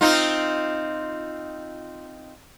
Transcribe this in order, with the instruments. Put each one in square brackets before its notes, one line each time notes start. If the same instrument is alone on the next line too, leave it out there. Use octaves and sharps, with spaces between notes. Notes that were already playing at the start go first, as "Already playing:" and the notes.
[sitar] C4 D#4 F4